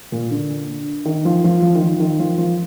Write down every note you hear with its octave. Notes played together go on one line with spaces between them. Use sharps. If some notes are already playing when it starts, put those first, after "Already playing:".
A#2
D3
D#3
F3
F3
F3
D#3
F3
D#3
F3
F3